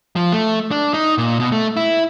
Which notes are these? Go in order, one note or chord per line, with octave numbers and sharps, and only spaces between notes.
F3
A3
D4
D#4
A#2
B2
A3
E4